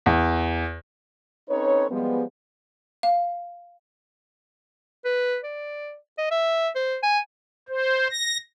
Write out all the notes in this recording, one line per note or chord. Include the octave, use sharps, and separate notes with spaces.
E2
C4 C#4 D#4 A4 B4 C#5
F3 G3 G#3 B3
F5
B4
D5
D#5
E5
C5
G#5
C5
A#6